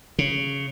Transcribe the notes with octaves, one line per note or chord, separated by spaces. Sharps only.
C#3